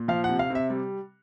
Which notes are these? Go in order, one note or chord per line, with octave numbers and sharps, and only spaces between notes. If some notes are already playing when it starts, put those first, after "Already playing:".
Already playing: A#2
F3 F5
F#5
C3
F5
C3 E5
G3